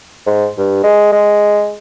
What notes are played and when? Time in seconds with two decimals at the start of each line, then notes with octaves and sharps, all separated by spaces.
0.27 G#2
0.58 G2
0.84 G#3
1.12 G#3